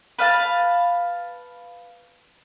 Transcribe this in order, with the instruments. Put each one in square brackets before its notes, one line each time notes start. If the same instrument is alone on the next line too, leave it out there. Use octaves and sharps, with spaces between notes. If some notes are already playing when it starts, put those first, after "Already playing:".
[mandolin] B4 F5 A5